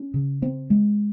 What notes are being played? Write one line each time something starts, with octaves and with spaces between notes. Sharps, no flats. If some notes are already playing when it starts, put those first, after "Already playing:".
Already playing: C#4
C#3
C4
G#3